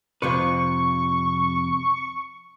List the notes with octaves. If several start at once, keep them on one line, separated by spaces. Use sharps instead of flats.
F2 C3 B4 C#6